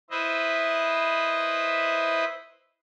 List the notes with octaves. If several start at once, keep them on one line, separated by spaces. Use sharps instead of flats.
E4 B4 C5 D#5 E5